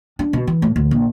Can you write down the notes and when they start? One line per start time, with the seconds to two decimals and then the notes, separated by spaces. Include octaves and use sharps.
0.19 D4
0.33 B2
0.47 E3
0.62 A2
0.76 D2
0.91 A#1